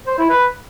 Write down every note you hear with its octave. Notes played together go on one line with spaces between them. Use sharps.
C5
E4
B4